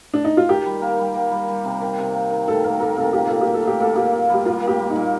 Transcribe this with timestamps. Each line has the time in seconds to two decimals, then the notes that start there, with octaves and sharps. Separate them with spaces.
0.14 D4
0.24 D#4
0.37 F4
0.49 D#3 G4
0.66 G3
0.81 A#3
0.98 G3
1.15 A#3
1.31 G3
1.48 G3
1.65 C3
1.81 D#3
1.98 C3
2.14 A#3
2.31 D#3
2.47 D#3 A4
2.64 A#3 A#4
2.80 A#3 A4
2.96 C3 A4
3.13 A#2 G4
3.27 A#2 A4
3.41 G4
3.47 A#2
3.54 A4
3.63 A#2 G4
3.80 A#3 A4
3.96 A#2 G4
4.13 A#2
4.29 G3 G4
4.45 A#3 F4
4.62 A#3
4.68 G4
4.79 G3
4.90 D#4
4.95 A#2